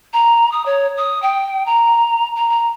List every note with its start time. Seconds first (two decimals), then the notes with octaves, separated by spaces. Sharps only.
0.13 A#5
0.52 D#6
0.66 C#5
0.97 D#6
1.22 G5
1.66 A#5
2.36 A#5
2.50 A#5